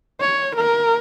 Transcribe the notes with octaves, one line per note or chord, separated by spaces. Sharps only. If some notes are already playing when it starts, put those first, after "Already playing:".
C#5
A#4